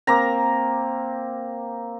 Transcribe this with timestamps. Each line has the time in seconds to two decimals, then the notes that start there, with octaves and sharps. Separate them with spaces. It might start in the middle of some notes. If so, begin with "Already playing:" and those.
0.07 A#3 C4 A#5